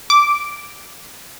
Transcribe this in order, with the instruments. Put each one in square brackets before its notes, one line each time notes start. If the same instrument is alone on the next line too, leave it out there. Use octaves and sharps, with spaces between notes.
[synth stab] D6